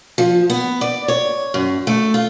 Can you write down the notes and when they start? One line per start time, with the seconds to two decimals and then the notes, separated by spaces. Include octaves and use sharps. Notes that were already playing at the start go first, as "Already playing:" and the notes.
0.18 F3
0.50 B3
0.81 D5
1.08 C#5
1.54 F#2
1.87 A3
2.14 F4